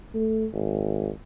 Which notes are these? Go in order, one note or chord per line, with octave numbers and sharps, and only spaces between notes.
A3
G#1